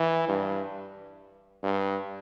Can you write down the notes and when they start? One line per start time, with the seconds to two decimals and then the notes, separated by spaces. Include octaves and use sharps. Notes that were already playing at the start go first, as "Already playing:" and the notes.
Already playing: E3
0.28 G2
1.63 G2